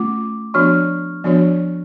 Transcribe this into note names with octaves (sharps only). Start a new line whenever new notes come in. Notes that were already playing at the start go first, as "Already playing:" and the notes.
Already playing: A3 C#4 F4 D6
F3 B3 D4 F#4 C#5 C#6 F6
F3 B3 D4 F#4 C#5